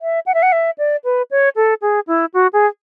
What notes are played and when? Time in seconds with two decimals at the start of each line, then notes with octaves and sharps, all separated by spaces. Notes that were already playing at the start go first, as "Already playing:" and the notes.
0.01 E5
0.26 F#5
0.34 E5
0.42 F#5
0.52 E5
0.78 D5
1.04 B4
1.31 C#5
1.56 A4
1.82 G#4
2.07 E4
2.34 F#4
2.53 G#4